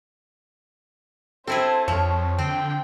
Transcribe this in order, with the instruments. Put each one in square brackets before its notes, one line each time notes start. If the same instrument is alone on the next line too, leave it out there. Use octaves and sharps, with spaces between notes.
[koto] C4 E4 G#4 [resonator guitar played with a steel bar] A4 [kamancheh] C5 A5
[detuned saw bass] F2 [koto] F3 [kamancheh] C#5
[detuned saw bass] D3 [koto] C4 [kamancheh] G5